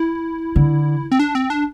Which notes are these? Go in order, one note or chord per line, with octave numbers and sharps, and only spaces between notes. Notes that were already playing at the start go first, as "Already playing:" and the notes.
Already playing: E4
D3
C4
D4
C4
D4